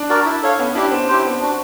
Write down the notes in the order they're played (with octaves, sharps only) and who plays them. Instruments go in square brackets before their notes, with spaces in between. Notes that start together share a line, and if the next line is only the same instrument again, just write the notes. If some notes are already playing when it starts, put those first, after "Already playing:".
Already playing: [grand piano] D4
[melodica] F#4 A#4 D5
E4
A4 C#5 F5
[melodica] B3 [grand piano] C#4
[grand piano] D4 [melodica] E4 G4
[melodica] B3 [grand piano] C4
[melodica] E4 G4 C5
B3
D4 F#4